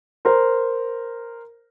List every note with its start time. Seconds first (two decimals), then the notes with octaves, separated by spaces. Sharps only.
0.25 A#4 C5